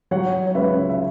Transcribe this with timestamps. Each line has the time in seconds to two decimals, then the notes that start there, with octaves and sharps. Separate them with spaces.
0.11 F#3 C#5 F#5
0.47 C#5
0.55 C#2 B4 E5
0.89 E5